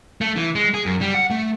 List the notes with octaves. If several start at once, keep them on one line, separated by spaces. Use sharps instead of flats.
A3
E3
G#3
G#4
F#2
G3
F#5
A3